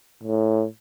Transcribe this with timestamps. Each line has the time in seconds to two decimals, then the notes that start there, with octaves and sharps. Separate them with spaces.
0.24 A2